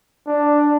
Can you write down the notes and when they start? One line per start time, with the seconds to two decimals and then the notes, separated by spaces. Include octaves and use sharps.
0.27 D4